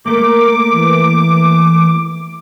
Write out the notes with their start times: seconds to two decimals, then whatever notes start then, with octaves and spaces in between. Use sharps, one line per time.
0.06 A3 A#3 A#4 D6
0.72 E3